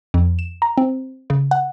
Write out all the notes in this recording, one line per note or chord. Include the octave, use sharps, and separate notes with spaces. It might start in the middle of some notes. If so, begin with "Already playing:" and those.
F2
E7
A#5
C4
C#3
F#5